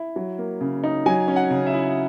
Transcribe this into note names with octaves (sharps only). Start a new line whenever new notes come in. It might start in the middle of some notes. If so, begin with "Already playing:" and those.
Already playing: E4
F#3
A#3
C#3
D#4
F#3 G#5
C#4
F#5
C#3
E5
E4